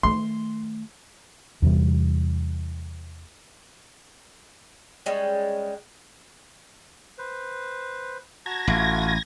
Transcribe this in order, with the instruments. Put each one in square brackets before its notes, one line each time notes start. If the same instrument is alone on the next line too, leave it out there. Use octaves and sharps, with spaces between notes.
[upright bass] D#3 A3 [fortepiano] C6
[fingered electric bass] E2 C3 E3 G3
[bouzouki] G3 G#3 C#4
[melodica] B4 C5
[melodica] F#4 A5 A#5 [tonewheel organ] G#6 A#6
[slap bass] A1 [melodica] A3 F4 F#4